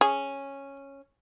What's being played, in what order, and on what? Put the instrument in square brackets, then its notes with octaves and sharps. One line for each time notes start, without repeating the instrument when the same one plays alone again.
[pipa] C#4 [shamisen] G#4